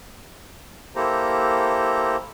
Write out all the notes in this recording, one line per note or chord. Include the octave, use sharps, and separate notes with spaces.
A#3 E4 G4 A4 C5 A#5